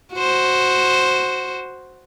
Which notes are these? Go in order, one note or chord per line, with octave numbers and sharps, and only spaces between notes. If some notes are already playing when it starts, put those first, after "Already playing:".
F#4 C5